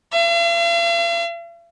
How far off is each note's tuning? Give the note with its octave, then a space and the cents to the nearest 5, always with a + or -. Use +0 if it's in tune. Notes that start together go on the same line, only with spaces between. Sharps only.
F5 -45